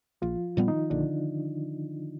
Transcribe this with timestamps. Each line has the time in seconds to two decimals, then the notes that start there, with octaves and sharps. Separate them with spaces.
0.22 A#1 F3 F4
0.57 A#2 G3 B3
0.68 D#3 D#4
0.90 A#1 D3 D4